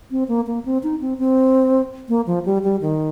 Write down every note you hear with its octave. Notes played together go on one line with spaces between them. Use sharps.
C4
A#3
A#3
C4
D#4
C4
C4
A#3
F3
G3
G3
D#3